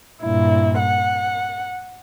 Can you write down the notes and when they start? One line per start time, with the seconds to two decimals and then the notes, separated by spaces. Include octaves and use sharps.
0.22 G2 A#2 E4
0.79 F#5